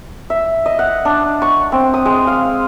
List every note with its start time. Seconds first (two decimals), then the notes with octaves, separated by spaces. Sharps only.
0.30 E5
0.66 D#5
0.79 F#5
1.05 D4
1.42 C#6
1.72 C4
1.94 D#6
2.06 G#3
2.27 F5